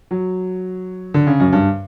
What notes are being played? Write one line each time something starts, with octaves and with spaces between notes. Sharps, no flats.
F#3
D3
C#3
F#2
G2